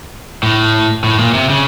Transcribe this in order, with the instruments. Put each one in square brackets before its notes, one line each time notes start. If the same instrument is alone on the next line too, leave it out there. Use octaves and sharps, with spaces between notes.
[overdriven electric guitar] A2
A2
A#2
C3
C#3